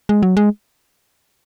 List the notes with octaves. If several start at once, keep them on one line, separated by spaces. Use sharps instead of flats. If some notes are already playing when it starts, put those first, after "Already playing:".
G#3
F#3
G#3